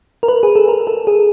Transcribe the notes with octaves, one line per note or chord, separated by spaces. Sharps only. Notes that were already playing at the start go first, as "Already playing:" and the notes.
A#4
B4
G#4
A4
A#4
A4
G#4